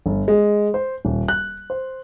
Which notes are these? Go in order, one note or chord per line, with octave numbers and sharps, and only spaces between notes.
G1
G#3
C5
D#1
F#6
C5